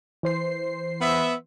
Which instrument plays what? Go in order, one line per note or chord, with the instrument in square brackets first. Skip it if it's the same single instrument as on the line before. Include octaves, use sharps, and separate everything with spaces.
[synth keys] E3 C5 C7
[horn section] B3 E5